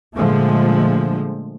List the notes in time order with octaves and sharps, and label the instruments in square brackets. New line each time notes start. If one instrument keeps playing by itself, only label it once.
[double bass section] A#2 D3 F3 G#3 A3